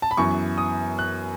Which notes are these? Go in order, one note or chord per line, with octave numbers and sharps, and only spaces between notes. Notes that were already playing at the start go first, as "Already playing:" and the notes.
A5
B5
F#2 E3 B3 C#6
D#6
F#6